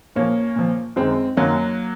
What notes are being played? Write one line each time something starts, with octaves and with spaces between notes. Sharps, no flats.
A#2 F3 A#3 C#4
A#2 F3
F#2 D#3 G#3 C4
F#2 D#3 F#3 A#3